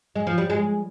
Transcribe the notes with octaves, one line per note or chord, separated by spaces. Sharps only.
G#3
F3
G3
G#3